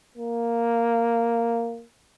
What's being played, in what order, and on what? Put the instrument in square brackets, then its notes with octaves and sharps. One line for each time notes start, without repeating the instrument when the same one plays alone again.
[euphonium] A#3